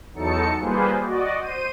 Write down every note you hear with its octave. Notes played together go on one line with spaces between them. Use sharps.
E2 F#3 D#4 A4 A5 C#7
G3 A#3 F4 G#4 B4 C5
F#4 D5 D#5
C5 D#7